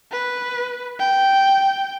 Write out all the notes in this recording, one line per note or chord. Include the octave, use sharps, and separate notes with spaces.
B4
G5